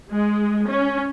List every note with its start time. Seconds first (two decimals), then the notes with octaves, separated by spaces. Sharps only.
0.10 G#3
0.68 C#4